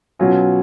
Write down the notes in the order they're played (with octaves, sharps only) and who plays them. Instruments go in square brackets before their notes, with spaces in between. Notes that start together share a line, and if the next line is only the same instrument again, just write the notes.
[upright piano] B2 F#3 C#4 F4